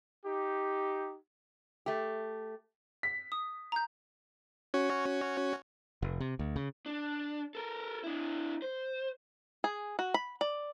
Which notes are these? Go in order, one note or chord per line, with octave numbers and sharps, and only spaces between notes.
D#4 G4
A3 G4
B6
D#6
A#5 G6
C#4 F#4 C#5
F1
C3
D2
C#3
D4
A4 A#4
D4 E4
C5
G#4
F#4
B5
D5